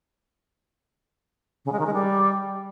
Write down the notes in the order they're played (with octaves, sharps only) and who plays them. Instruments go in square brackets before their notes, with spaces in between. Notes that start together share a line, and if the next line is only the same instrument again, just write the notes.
[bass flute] C#3
G#3
D#3
G#3
G3